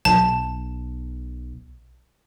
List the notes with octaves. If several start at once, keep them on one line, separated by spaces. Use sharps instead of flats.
B1 A5